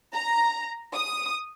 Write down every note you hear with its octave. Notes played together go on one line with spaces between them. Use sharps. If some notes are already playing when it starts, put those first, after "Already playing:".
A#5
D#6